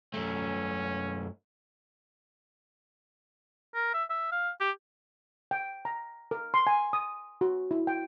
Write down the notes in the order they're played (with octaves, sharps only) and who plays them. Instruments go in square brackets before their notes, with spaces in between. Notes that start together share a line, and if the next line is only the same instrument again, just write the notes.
[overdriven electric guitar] F#2 A3 [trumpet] C#4
[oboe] A#4
E5
E5
F5
G4
[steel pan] G5
A#5
A#4
C6
G#5
D#6
F#4
E4
G5